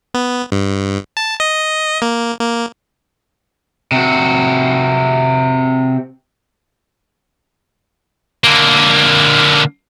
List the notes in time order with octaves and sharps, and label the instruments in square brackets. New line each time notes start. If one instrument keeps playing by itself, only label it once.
[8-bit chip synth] B3
G2
A5
D#5
A#3
A#3
[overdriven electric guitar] C3 F#4
[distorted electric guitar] D3 A#3